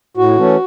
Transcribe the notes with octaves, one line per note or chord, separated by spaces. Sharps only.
A2 F#4
E3 A3 C#4